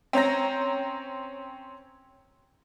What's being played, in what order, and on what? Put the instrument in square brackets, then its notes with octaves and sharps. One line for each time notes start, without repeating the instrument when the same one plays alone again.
[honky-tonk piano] C4 C#4 A#5 A#6